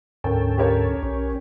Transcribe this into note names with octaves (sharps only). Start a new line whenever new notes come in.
D2 G#2 C#4 A4 A#4 G5
G4 A#4 C#5
B1 C#4